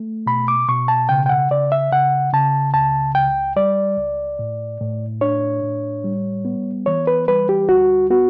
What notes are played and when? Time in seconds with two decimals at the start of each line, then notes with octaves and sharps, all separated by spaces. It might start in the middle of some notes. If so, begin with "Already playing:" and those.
Already playing: A3
0.26 B2 B5
0.48 D6
0.68 B2 C#6
0.88 A5
1.09 C#3 G5
1.26 G5
1.29 F#5
1.51 C#3 D5
1.72 E5
1.92 C#3 F#5
2.33 C#3 A5
2.74 C#2 A5
3.15 C#2 G5
3.56 G3 D5
3.98 C#2
4.39 A2
4.80 A2
5.21 D4 C#5
5.63 A2
6.04 G3
6.45 B3
6.86 E3 C#5
7.07 B4
7.27 G3 B4
7.49 G4
7.69 D2 F#4
8.10 B3 F#4